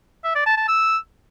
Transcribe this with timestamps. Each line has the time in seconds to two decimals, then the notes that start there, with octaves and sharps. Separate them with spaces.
0.24 E5
0.35 D5
0.46 A5
0.57 A5
0.68 E6